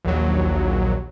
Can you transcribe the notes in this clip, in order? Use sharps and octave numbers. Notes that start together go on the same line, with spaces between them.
A#1 D#2 F#3